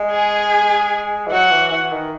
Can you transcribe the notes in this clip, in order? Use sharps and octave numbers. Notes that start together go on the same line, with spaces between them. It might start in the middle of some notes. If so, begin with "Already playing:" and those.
Already playing: G#3
G#4 G#5
E3
F#3 F#4 F#5
E3
E3
D#3